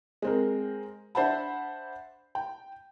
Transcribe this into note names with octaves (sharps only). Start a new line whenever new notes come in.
G#3 C4 A#4
D4 C5 E5 F#5 A5 B5
G5